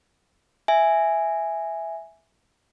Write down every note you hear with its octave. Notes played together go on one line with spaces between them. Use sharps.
E5 G#5